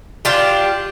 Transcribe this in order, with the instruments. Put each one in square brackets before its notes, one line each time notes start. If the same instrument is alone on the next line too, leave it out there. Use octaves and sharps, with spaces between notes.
[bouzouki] D4 F4 G4